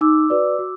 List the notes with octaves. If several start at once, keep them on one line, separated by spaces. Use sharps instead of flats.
D#4 D6 E6
F#4 B4 D5
F#4